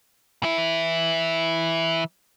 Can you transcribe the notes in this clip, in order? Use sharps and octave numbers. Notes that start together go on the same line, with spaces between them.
E3 E4